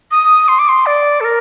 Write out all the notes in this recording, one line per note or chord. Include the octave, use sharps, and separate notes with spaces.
D#6
C6
D6
C6
D5
A4
A#4